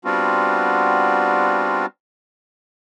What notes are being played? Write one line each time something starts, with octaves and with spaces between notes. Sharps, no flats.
G3 B3 C4 D4 F4 F#4